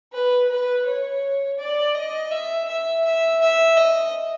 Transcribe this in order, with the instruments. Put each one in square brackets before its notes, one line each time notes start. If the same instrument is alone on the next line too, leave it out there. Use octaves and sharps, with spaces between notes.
[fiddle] B4
B4
C#5
D5
D#5
E5
E5
E5
E5
D#5